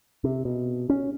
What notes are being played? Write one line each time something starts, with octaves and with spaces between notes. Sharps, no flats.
C3
B2
C#4